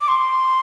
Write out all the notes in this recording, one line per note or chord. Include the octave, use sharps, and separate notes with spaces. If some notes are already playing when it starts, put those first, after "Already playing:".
D6
C6